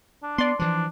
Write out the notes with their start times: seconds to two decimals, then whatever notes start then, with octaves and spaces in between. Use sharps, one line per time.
0.23 D4
0.38 B3 D5 C6
0.59 E3 F3 D4